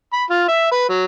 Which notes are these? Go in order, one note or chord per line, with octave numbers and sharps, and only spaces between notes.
B5
F4
E5
B4
F#3